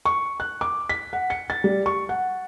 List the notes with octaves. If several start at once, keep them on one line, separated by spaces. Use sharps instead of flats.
C#6
F#6
D6
B6
F#5
C#7
A6
G3
C#6
F#5